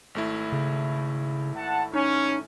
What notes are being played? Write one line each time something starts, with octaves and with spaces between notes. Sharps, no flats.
G#1 A3 E4
C#3
F#5 A5
C#4 D#4